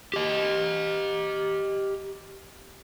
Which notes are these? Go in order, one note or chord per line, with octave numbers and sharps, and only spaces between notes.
G4 D#5